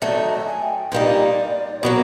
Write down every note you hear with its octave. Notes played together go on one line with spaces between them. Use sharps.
D#3 F#3 A3 D5
D#5
E5
G#5
G5
A#2 G3 A#3 D#4 D5
B2 F#3 A#3 A#4